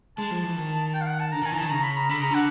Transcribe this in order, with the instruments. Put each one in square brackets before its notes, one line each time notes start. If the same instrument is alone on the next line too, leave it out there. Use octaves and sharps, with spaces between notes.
[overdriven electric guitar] G#3 [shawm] A5
[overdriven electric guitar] F3
E3
D#3
[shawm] G5
F5
F#5
A5
[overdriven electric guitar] D3 [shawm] A#5
[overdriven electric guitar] D#3 [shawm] G#5
[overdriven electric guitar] E3 [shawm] A#5
[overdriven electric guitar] D#3 [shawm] A5
[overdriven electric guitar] C#3 [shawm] A#5
[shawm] B5
A#5
[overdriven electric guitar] D3 [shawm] B5
[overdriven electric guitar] C#3 [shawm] A#5
[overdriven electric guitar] D3 [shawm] F#5